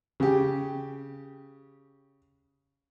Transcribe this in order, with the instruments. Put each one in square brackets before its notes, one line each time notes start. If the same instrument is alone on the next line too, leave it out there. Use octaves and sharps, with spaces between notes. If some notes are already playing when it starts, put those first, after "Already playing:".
[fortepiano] C#3 G4